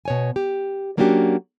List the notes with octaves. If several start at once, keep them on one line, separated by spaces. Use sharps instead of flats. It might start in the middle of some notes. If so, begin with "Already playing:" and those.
B2 C#5 G#5
G4
F#3 A#3 C#4 D4 F#4 G4